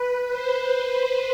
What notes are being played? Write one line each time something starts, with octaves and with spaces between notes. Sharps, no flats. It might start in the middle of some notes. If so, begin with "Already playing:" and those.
Already playing: B4
C5